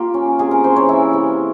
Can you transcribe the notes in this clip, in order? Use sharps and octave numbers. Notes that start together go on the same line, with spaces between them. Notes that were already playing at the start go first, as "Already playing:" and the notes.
Already playing: A#3 F4 G4
C#4
C3 G#4
A#4
E3 C5
C#5
E3 E5
C3